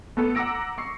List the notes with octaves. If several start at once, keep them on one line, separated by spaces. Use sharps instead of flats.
A3 B3 A4
F#5 A#5 D6 E6 A#6 D7
C#6 C7